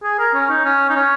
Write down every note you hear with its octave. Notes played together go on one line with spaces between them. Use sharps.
G#4
A#4
C#4
D#4
C#4
D#4
C#4